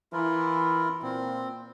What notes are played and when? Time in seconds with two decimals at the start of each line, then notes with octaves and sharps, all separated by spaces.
0.13 E3 E4 F4 A#4
1.02 A#2 C4